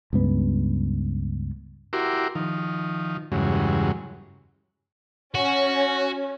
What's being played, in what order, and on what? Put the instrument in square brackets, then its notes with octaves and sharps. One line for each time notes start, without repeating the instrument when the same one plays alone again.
[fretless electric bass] C#2 G2 B3
[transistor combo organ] E4 F#4 G4 A#4 C6 D6
D#3 F3
E2 G2 C#3 F#3 G#3
[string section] C#4 [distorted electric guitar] F#4